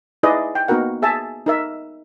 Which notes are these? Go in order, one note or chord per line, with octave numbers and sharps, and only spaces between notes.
D#4 E4 G#4 B4 D5 D#5
G5
A#3 B3 D#4 F#4 A#4 F#5
G#4 E5 G#5 A5
D#4 A#4 E5